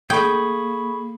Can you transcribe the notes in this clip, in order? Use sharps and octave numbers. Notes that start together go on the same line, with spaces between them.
A#3 G#4 A4 G5 B5 C#6 D#6 G#6